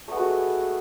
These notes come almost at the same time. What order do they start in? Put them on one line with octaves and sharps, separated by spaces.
A3 B3 G#3 F#4